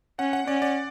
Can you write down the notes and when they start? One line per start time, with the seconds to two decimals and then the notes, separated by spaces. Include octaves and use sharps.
0.19 C#4 F#5
0.33 F#5
0.47 C#4 D5
0.62 D5